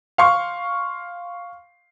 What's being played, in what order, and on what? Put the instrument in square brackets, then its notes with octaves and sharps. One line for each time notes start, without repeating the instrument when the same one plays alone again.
[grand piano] F5 C6 C#6